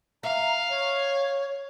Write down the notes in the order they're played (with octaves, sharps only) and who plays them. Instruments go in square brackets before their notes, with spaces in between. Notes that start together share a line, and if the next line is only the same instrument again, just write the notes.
[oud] E5 [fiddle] F5 [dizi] A#5
[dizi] C#5